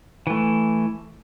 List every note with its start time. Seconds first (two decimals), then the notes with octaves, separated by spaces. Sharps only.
0.27 E3 A3